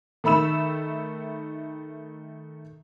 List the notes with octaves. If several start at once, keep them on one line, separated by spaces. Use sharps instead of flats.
D#3 A3 B5 E6 E7